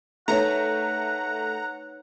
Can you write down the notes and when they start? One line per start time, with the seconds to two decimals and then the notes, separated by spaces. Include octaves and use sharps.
0.28 A3 D#4 B4 C#5 F#5 A#5